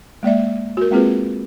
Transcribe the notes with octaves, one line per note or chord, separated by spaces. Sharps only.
G#3 A#3 D5 E5
F#4 A#4
G#3 A#3 C4 F4 G#4 B4